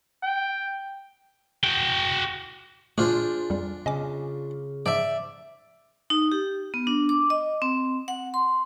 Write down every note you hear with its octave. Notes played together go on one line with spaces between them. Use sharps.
G5
F#4 G5
A#2 A3 D4 F4 G#4 C5
F2 G3
C#3 D#5 G#5 D6
G#2 F3 D5 E5
D#4
G4
B3
D4
D6
D#5
C4
F#5
C6